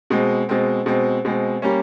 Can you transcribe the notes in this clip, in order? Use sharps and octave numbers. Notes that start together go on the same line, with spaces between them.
B2 G#3 C4
B2 G#3 C4
B2 G#3 C4
B2 G#3 C4
G3 A#3 C#4